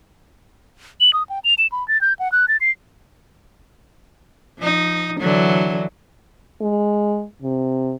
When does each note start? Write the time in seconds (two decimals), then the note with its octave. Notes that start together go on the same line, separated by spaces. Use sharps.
1.01 F#7
1.13 D#6
1.29 G5
1.44 F7
1.58 E7
1.72 B5
1.88 A6
2.01 G6
2.19 F#5
2.32 F#6
2.48 A6
2.61 C7
4.58 F3 D#4
5.20 D3 E3 F#3
6.61 G#3
7.42 C3